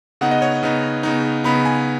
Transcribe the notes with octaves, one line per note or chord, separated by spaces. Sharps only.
C#3 B3 D#4 F#5
D#5
C#5
C#3 B3 D#4
C#3 B3 D#4
C#3 B3 D#4 B5
G#5